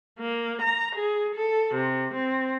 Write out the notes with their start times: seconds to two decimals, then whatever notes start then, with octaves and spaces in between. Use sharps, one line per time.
0.19 A#3
0.62 A#5
0.95 G#4
1.35 A4
1.75 C3
2.14 C4